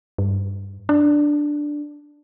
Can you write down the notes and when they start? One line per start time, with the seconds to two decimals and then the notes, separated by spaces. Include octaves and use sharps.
0.18 G2
0.89 D4